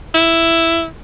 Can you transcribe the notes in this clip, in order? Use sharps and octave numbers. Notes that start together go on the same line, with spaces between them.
E4